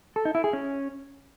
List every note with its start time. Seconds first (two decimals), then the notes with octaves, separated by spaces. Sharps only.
0.16 A4
0.25 D#4
0.35 E4
0.44 G#4
0.53 C#4